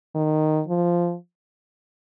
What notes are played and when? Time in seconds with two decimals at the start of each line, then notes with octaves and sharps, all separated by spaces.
0.15 D#3
0.68 F3